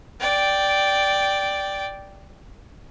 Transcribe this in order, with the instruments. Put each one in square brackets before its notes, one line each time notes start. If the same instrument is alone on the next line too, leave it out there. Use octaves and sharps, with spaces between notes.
[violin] D5 G5